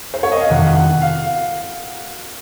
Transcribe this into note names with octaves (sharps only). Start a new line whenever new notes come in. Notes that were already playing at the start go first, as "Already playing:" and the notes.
C5
C#5
D#5
F5
F2 C3 D#3 F#5
F#5
F5